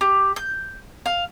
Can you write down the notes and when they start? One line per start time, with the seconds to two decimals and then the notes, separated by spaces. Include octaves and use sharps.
0.01 G4
0.36 G6
1.06 F5